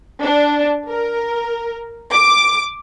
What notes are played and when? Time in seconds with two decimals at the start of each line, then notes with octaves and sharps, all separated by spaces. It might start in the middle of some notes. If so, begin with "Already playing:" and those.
0.22 D4
0.88 A#4
2.12 D6